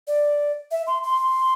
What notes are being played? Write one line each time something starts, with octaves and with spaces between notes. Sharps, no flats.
D5
E5
C6
C6